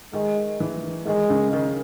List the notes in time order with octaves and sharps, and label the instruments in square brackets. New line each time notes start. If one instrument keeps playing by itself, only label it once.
[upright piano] D#3 [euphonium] G#3
[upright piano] E3
[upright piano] D#3 [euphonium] G#3
[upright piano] C#3
D#3